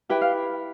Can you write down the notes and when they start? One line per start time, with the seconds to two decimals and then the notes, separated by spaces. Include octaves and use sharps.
0.09 E4 G4 B4 G5
0.21 F5